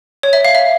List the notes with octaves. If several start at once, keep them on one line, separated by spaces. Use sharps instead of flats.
C#5
E5
F5
E5